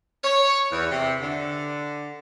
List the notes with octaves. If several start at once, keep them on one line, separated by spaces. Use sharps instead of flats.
C#5
E2
C3
D3